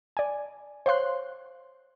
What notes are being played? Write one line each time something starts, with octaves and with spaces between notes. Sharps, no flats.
D5 G#5
C5 C#5 F5 C6 F#6